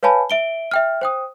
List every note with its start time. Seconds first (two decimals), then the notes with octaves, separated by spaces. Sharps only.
0.03 B4 C#5 F5 G#5 A5 B5
0.30 E5 D7 G7
0.71 E5 G5 F6
1.01 C5 G5 D#6